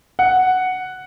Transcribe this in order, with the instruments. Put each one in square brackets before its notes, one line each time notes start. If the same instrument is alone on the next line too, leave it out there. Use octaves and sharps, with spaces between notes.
[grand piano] F#5